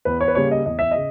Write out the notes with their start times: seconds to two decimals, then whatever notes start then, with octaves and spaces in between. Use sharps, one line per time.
0.05 E2 B4
0.21 C#5
0.28 B4
0.35 C#3 G3 A#3 C#5
0.51 D#5
0.66 E2 D#5
0.79 E5
0.91 C#3 D#5